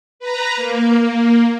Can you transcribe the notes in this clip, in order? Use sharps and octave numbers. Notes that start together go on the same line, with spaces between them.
B4 A#5
A#3